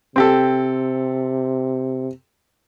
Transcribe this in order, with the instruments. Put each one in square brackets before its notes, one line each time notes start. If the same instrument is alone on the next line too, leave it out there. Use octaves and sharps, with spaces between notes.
[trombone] C3 [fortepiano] C4 G4 A4